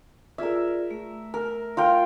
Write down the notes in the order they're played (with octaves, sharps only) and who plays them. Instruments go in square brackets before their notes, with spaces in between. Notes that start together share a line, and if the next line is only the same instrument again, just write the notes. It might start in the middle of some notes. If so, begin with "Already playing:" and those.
[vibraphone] F4 G#4 D5 [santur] A#4 E5
[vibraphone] A3
[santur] A#4
F4 A#4 G5